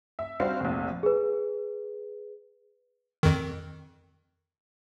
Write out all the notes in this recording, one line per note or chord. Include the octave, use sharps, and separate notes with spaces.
E5
G3 C4 D4 F#4 C5 F5
F1 A#1
G#4 B4
F2 D#3